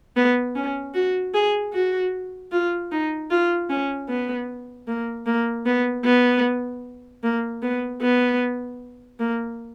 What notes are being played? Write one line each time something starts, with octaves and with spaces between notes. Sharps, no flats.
B3
C#4
F#4
G#4
F#4
F4
D#4
F4
C#4
B3
A#3
A#3
B3
B3
A#3
B3
B3
A#3